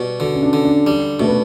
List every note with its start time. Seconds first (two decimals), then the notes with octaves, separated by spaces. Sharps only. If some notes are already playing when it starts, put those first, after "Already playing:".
Already playing: B2 G3
0.20 D3 F#4
0.34 C#4
0.43 D4
0.53 D3
0.65 D4
0.87 G3
1.20 B2 A3
1.28 B3